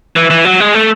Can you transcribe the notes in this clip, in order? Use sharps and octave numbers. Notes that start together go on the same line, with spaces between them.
E3
E3
F#3
G#3
A3